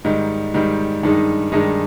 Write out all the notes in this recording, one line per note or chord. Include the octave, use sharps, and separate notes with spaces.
G#2 D#3 G3
G#2 D#3 G3
G2 D#3 G#3 D#4
G2 D#3 G#3 D#4